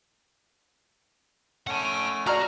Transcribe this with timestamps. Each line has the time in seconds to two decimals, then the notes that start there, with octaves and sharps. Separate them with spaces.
1.67 A3 C#4 F#5 A5
2.27 F#4 D5 F#5 A#5 F6